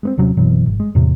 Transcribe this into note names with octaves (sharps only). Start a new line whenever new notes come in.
G#3 B3 C4
D#1 C3 F#3 C#4
F#1 B2 E3 F#3
G#1
G#3
E2 A2 C3